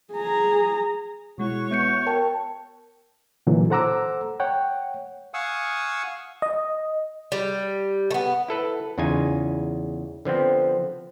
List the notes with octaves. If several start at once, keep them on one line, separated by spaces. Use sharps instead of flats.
G#4 A#5
B2 G#3 E4 F#4 C#5 C#6
B3 E5 G6 C#7
A#4 G5 A5
A#2 D3 E3 F#3
A4 C5 F#5 A#5 D6 E6
C#5 F#5 G5
F5 F#5 G#5 C#6 D#6 E6
D#5
G3
A3 B3
E4 A4 B4
E2 C#3 D#4 F4 G#5
D3 F3 B3 C4